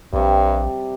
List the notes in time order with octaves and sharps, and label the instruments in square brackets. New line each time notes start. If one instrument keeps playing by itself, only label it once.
[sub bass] A#1 [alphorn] G2 [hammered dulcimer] C3 G3